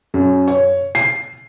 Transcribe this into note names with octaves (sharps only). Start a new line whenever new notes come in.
F#2
C#5
C7